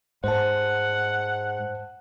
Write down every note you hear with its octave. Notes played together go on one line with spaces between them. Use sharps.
G#2 C5 F#5 A5